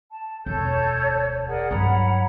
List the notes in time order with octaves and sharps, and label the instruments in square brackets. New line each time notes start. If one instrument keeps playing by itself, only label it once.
[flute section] A5
[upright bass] E1 D2 [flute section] A4 A5 G6 [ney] C#5
[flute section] G#4 A#4 D5 [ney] F#5
[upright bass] G2 F#3 [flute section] C#5 A#5 B5